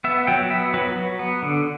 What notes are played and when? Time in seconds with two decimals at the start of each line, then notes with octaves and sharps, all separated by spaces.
0.04 B3 E5
0.27 F#3 G5
0.50 B3 E5
0.74 F#3 B4
0.96 F#3
1.19 B3
1.43 D3